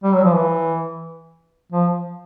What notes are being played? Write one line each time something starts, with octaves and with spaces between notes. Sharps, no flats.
G3
F#3
F3
E3
F3